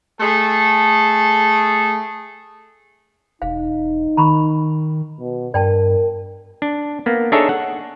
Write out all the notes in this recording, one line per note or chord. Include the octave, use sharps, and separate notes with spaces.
A3 G#4 A4
E1 D#4 F5
D#3 A#5 B5 C#6
B2
G2 A#4 D5 G5 A5
D4
A#3 B3
D4 D#4 G#4 A4 C#5 E5
F#5